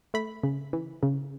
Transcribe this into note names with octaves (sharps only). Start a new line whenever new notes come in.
A3 B5
C#3
E3
C#3